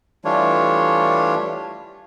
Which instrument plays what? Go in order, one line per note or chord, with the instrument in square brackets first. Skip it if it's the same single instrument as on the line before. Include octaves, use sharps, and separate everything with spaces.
[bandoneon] E3 G3 A3 D4 F4 C#5